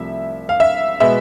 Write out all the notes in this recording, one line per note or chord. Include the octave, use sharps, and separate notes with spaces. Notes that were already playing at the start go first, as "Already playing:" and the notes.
Already playing: C2 C3 F3 A3 E5
F5
E5
B2 G#3 B3 E5